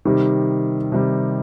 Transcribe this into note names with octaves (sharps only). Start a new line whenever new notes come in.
C3 D#3 G3
C3 D#3 G3